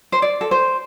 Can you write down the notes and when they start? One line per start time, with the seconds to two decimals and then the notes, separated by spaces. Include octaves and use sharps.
0.12 C5
0.22 D5
0.41 A4
0.51 C5